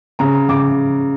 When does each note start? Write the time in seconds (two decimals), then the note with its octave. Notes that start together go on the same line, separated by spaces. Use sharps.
0.19 C#3 A#5
0.49 C#3 D6